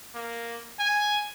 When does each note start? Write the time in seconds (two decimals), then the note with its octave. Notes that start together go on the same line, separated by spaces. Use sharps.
0.14 A#3
0.79 G#5